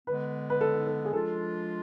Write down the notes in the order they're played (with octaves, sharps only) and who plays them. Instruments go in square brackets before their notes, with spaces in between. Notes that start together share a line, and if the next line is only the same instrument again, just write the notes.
[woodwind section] D3 G#3 B3 [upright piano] B4
[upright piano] B4
A4
A4
G#4
[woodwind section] F3 G#3 D4 F4 [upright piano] A4